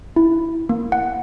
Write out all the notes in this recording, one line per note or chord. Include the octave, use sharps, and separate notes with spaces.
E4
A#3
F#5